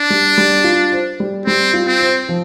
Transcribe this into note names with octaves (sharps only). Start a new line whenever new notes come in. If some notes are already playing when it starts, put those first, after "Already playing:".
Already playing: D4
G3
G3
F4
C5
G3
G3 C4
F4
C4
C5
F3